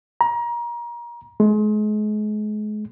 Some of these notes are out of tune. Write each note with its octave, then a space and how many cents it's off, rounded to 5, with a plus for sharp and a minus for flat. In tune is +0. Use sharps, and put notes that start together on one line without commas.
A#5 +30
G#3 +35